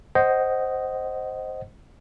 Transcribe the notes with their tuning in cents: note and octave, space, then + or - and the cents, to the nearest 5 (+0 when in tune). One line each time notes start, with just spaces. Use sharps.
C5 +0 D#5 +0 F#5 +25